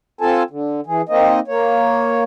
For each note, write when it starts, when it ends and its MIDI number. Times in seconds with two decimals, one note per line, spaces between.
0.21 0.43 60
0.21 0.43 65
0.21 0.43 69
0.21 0.43 80
0.21 0.43 81
0.50 0.81 50
0.87 1.02 52
0.87 1.02 68
1.09 1.40 58
1.09 1.40 60
1.09 1.40 63
1.09 1.40 75
1.48 2.23 58
1.48 2.23 73